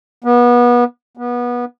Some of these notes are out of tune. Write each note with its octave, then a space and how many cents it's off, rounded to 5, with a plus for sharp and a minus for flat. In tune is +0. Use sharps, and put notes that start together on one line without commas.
B3 -30
B3 -25